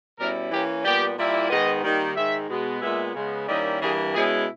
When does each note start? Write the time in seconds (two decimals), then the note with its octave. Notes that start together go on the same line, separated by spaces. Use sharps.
0.18 B2 G3 C#4 E4 A#4
0.51 E3 A#3 C#4 G4
0.84 A#2 G3 B3 G4
1.17 A#2 G3 A#3 E4
1.49 G#2 D#3 G#3 B3 D#5
1.83 D#3 G3 A#3
2.15 G#2 D#3 G#3 E5
2.49 B2 G#3 B3
2.82 A#2 G#3 B3 E5
3.14 C#3 G#3 B3
3.48 D#3 G3 A#3 C#4 E4 D#5
3.81 G2 E3 G3 A#3 G#4
4.13 B2 G#3 C#4 E4 G#4